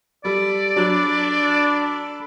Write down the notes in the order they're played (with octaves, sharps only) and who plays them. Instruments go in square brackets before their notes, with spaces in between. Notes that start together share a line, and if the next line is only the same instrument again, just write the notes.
[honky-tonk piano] G3 [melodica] A4 B5 [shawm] D5
[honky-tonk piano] F#3 [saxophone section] D4